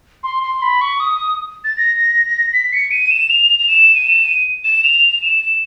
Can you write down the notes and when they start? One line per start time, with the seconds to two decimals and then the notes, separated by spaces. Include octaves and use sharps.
0.23 C6
0.43 C6
0.62 B5
0.81 C#6
1.00 D#6
1.64 A6
1.77 A#6
2.53 B6
2.73 C#7
2.91 D#7
3.11 E7
3.30 F7
3.59 F7
3.68 E7
3.95 D#7
4.07 E7
4.25 D#7
4.64 E7
4.83 F7
5.22 E7